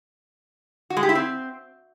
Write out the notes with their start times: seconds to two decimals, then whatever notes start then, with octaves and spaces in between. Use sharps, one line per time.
0.90 F#4
0.97 G#3
1.03 G4
1.09 E4
1.15 C4